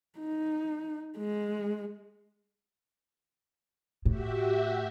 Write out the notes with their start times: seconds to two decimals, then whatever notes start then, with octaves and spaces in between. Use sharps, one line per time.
0.18 D#4
1.17 G#3
4.05 A2 F#4 G4 E5